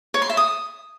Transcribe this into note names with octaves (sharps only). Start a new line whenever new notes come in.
C#5
C6
E5
D#6